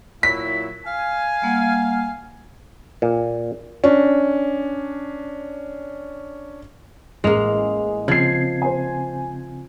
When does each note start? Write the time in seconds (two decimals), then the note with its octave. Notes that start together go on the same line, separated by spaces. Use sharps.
0.23 A#2 F#3 E4 B6
0.86 F5 G#5
1.42 G3 A#3 F#5
3.02 A#2
3.84 C#4 D4
7.24 A1 G#3 A#3 G#4 F7
8.08 C#3 F3 C4 G#6 C7
8.62 C5 G#5